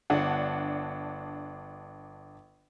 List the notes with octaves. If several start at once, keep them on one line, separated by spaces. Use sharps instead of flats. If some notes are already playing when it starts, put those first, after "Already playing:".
G1 D4 F#5